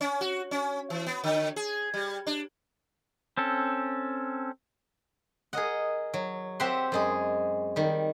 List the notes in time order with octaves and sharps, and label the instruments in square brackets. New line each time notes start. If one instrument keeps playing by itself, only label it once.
[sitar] C#4
F#4
C#4
E3
B3
D3
G#4
G3
D4
[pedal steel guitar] C4 C#4 A4
[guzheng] G#4 A#4 D#5 F#5
F#3
C4 G4 E5 F#5 C6
F#2 G#3 G#4
D#3 G3